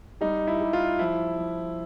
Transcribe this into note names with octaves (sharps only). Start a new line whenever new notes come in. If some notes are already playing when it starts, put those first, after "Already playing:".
G3 D#4
E4
G3
F4
F3 E4
F3